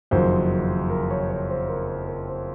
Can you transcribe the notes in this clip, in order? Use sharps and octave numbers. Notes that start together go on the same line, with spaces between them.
F#1 F2 D#3 F#3 C5
A#4
C#5
C#5
C5
A#4
C5
A#4
C5